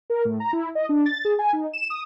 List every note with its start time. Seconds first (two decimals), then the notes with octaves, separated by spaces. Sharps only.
0.10 A#4
0.25 A2
0.40 A#5
0.53 E4
0.75 D#5
0.89 D4
1.06 A6
1.25 G#4
1.39 G#5
1.53 D#4
1.73 E7
1.90 D#6